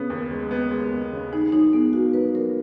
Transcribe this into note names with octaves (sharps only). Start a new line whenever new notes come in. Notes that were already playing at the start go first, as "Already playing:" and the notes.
Already playing: C#3 B3 C#4
D#2
G#3
B3
G#3
D#2
C#3
D#4 G#4
F#3 D#4
B3 G#4
A#3 F#4
F#3 B4
F#3 A#4